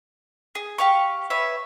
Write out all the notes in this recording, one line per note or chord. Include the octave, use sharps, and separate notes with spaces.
G#4
G4 F5 C#6
B4 C#5 E5